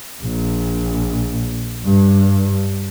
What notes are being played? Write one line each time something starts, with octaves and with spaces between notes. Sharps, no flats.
A#1
G2